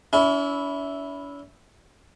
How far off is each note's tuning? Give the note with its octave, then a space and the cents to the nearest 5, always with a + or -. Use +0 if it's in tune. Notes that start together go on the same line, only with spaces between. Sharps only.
C#4 +45 E4 -5